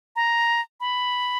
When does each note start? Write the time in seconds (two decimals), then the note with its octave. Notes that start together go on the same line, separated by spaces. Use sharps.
0.16 A#5
0.80 B5